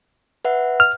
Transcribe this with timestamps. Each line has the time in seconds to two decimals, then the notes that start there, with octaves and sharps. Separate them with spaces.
0.45 B4 E5 F#5
0.80 F6